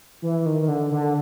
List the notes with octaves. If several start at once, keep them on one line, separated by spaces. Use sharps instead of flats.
E3
D#3
D#3
D3
D3